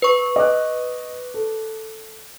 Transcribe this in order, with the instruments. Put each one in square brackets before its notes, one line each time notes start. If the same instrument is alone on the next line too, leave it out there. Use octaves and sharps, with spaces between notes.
[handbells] B4 C#6
[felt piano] D#5 D6 F#6
A4